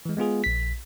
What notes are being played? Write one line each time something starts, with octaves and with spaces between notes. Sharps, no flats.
E3 G#3
G#3 B3 F4 G#4
A#1 B6